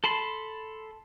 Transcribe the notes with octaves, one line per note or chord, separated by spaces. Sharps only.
A4 A5 B5 C6